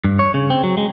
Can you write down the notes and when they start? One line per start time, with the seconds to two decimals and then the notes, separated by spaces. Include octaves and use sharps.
0.04 G2
0.19 C#5
0.34 C#3
0.50 C4
0.64 F#3
0.77 G#3